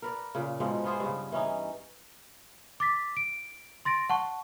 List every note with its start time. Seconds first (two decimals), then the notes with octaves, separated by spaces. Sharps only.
0.02 A#4 B4 D5
0.35 A#2 C#3
0.60 G#2 B2 F3 G#3
0.84 B3 F4 G#4 C5
1.00 G2 C#3
1.32 E3 C#4 D#4
2.80 D6 A6 B6
3.17 D7
3.85 C6 A6 A#6 D7
4.09 F#5 A5 C#6